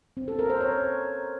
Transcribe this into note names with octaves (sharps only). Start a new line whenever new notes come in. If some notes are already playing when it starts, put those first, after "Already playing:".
C4
A4
A#4
C5
C#5